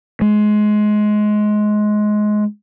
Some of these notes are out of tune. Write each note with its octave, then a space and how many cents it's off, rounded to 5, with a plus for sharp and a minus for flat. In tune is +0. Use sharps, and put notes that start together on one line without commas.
G#3 +20